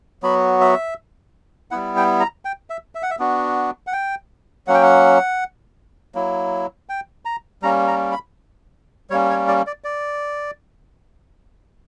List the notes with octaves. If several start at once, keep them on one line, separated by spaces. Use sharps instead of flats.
F#3 B3 F#4 B5
E5
G3 B3 E4 F#5
G5
A#5
G5
E5
E5
F#5
E5
B3 D4 F#4
F#5
G5
F#3 A#3 C#4 F#5
G5
F#5
F#3 A#3 E4
G5
A#5
G3 A#3 C#4 A#5
A#5
B5
G3 A#3 C#4 C#5
C#5
D5
D5
D5